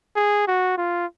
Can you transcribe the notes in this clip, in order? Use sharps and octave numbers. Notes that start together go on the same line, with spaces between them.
G#4
F#4
F4